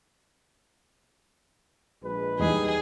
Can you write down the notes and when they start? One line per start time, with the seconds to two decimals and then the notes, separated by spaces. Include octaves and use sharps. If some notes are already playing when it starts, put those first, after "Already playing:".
2.03 A#1 G#3 B4
2.40 E2 G3 D#4 G#4 D#5